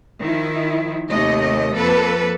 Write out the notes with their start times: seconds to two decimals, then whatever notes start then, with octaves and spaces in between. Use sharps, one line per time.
0.21 D#3 F3 E4
1.09 D#2 C3 A3 D#5
1.75 F2 A#3 A4 B4